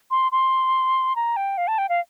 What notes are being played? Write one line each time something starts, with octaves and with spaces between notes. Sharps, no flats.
C6
C6
A#5
G5
F5
A5
G5
F5